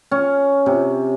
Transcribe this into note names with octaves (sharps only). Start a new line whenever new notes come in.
C#4
C3